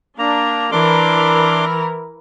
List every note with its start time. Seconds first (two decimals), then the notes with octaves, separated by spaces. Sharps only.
0.19 A#3 D4 A#5
0.72 E3 D4 A#4 C6 D6